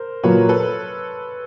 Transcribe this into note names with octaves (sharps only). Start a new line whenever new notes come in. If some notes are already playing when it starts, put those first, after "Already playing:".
Already playing: A#4 C5
A#2 F#3 A#3 B4 C#5
A4 B4